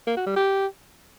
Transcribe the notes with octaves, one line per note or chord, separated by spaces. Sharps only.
A#3
F#4
G3
G4